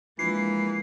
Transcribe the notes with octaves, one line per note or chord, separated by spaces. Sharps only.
E3 F3 G#3 A#3 D4 F4 C7